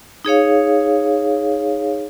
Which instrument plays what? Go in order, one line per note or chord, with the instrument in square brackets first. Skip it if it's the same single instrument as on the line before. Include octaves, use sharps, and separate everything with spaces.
[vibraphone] D#4 G#4 C#5 F5